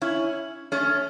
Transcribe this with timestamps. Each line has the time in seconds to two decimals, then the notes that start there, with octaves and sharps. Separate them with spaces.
0.02 C#4 E4
0.72 A3 C#4